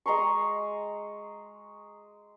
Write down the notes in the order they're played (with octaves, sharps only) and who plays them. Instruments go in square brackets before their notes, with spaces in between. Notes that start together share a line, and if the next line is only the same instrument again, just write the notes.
[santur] G#3 A#5 C6 C#6